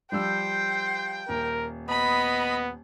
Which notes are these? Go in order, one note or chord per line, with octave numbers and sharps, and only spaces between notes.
F3 G3 C5 G5 E6
D#1 A#4
B3 D#5 B5